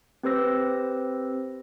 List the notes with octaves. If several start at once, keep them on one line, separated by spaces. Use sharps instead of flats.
C4 G4 B4 C5 E6 A#6